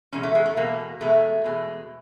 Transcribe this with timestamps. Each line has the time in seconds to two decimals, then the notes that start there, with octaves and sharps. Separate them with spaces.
0.12 E2 B2 G#3 C#4
0.23 A3
0.35 G#3
0.46 A3
0.56 E2 B2 G#3 A#3
1.01 E2 B2 G#3 A3
1.44 E2 B2 G#3